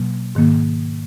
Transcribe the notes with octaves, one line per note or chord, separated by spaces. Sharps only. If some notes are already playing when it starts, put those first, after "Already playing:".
Already playing: B2 F#3 A#3
G#2 D#3 A#3